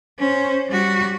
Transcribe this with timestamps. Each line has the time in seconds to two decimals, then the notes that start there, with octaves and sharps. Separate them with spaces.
0.19 C#4 C5
0.68 G3 F#4